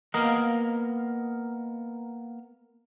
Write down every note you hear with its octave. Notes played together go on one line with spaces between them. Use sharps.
A#3 B3 A#4 D#5 F5